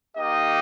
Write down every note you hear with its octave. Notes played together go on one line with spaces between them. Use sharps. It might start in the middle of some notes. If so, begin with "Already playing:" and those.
A#3 D#4 G4 D#5